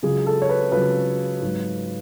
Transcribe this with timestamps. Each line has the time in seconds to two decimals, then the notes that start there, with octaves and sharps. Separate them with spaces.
0.02 C#2 C#3 F#3 G#4
0.26 A4
0.42 C#5
0.49 B4
0.72 C#2 C#3 F#3 B4
1.42 G#2 F#3